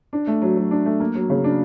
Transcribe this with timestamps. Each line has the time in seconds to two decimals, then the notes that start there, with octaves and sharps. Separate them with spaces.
0.13 D4
0.27 A3
0.42 F#3
0.57 F#3
0.71 D4
0.86 A3
1.00 A#3
1.15 F#3
1.30 C#3
1.44 D4